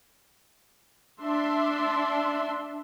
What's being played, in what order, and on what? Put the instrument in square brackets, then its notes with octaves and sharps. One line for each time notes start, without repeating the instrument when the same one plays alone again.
[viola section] D4 E5 C6